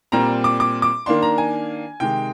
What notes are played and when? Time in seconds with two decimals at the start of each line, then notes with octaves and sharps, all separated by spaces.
0.12 A#2 G3 C4 A#5
0.44 D6
0.60 D6
0.82 D6
1.06 D#3 A#3 D4 C6
1.22 A#5
1.38 G#5
2.00 C3 D#3 G#3 G5